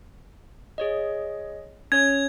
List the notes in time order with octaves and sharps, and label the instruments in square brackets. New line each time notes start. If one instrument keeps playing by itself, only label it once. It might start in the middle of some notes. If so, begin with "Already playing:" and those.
[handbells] G#4 C#5 D#5
[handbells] C#4 C#5 [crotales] G#6